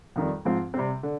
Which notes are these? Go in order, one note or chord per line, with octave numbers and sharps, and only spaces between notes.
F2 D#3 G3
G#2 F3 C4 F4
C3 G3 C4
D3